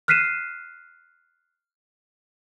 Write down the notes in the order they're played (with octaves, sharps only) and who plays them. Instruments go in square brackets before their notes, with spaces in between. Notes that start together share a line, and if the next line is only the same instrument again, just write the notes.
[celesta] F6 F#6 B6 C7 D#7 E7